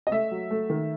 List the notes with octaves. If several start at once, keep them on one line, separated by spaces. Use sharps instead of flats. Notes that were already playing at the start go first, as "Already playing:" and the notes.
D#5
A3 E5
F#3
A3
D#3